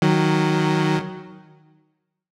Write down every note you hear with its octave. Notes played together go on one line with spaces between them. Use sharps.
D#3 F#3